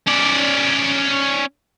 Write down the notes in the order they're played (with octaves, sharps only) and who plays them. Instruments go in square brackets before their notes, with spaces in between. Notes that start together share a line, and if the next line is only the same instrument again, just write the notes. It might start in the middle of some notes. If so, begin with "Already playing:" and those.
[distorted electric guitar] C#4 D5